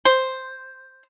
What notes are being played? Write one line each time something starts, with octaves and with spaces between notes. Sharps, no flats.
C5